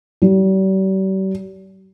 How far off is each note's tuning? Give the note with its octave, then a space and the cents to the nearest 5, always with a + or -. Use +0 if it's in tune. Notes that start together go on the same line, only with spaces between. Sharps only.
G3 -40